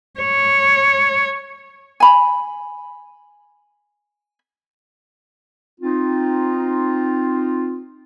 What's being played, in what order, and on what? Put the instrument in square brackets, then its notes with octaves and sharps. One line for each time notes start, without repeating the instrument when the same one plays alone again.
[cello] C#5
[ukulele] G#5 B5
[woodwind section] C4 D#4 F4